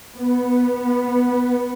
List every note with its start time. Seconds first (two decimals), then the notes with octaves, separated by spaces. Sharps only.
0.15 B3